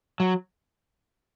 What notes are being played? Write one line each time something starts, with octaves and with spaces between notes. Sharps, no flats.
F#3